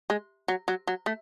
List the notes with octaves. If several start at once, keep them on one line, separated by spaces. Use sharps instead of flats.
G#3
F#3
F#3
F#3
A3